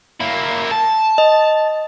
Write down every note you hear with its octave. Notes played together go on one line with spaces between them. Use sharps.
A#3 E4
A5
D#5